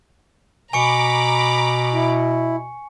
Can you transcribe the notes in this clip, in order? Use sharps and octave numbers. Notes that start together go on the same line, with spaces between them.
B2 G#5 A#5 B5 C#6 D6 C#7
E4